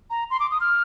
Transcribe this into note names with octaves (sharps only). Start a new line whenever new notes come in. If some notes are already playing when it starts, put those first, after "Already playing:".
A#5
C6
D6
D#6
F6